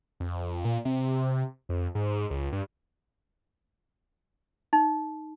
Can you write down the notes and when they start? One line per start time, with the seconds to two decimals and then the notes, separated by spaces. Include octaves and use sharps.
0.20 F2
0.65 A#2
0.85 C3
1.69 F2
1.95 G#2
2.30 C#2
2.53 G2
4.73 D#4